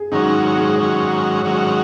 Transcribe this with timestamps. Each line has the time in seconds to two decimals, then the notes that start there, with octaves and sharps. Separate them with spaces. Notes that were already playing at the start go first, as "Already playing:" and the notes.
Already playing: G#4
0.12 G#2 D#3 F#3 C#4 D#4 F#4
0.56 G#3
0.78 G#2 D#3 F#3 C#4 F#4
1.44 G#2 D#3 F#3 C#4 F#4